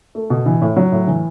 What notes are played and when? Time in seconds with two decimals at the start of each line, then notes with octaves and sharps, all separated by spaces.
0.15 A3
0.30 B2
0.46 E3
0.61 A2
0.76 F#3
0.92 A2
1.07 E3